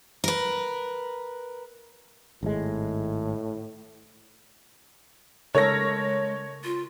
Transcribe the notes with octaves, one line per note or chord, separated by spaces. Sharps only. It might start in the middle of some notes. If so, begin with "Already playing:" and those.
A#4 B4
G#1 A2 G#3
C#3 G#3 A4 A#4 C#5 A#6
F4